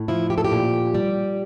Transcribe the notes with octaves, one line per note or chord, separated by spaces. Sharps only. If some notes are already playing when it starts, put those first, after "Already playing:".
Already playing: A2
F3 E4
G4
A4
G4
A#2
G3